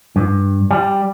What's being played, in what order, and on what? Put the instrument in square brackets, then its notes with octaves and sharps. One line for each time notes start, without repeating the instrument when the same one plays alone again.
[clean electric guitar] G2
G3